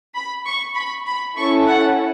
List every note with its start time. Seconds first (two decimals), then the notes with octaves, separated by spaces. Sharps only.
0.15 B5
0.45 C#6
0.75 B5
1.06 B5
1.36 C#4 E4 A4 C#6
1.68 F#5